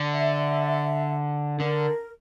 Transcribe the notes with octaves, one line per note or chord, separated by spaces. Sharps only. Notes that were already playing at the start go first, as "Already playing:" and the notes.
Already playing: D3
E5
D3 A#4